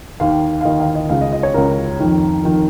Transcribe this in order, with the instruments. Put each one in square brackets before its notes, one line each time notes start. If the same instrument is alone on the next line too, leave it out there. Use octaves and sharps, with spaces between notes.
[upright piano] D#2 D#3 F5
F5
D#2 D#3 D#5
F5
D#5
C#2 C#3 F5
D#5
D#5
C#5
C#2 C#3 A#4
F2 D#3
F2 D#3